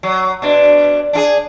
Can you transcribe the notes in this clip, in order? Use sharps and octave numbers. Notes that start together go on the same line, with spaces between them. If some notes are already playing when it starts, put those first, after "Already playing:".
F#3
B2 D4
D4 E4 G#4